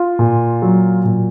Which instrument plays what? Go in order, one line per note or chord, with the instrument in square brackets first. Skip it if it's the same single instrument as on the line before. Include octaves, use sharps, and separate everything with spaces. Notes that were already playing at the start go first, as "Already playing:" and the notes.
Already playing: [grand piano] F4
A#2
F#3
A#2